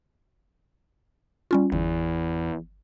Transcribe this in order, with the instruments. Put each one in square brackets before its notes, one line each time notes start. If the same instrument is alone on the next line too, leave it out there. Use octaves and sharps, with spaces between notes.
[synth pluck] G3 C#4 F4
[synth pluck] G1 [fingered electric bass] E2